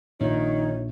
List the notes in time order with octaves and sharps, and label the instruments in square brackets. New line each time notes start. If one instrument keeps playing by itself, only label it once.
[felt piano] A#1 A#2 [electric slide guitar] D#3 [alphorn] D#4 [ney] C#5